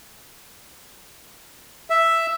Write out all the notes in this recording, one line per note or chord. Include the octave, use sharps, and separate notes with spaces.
E5